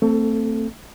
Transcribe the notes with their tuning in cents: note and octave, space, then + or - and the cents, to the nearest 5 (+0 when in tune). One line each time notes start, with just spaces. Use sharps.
A3 +35 C4 +0 A4 +0